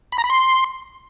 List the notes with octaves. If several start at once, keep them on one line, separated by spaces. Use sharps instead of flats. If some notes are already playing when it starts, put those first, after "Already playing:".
B5
A#5
B5
C6